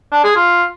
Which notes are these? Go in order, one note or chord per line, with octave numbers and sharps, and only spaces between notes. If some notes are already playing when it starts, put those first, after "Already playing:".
D4
G#4
F4